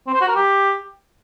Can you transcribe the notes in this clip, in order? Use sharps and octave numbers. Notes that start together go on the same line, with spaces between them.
C4
C5
F#4
A#4
G4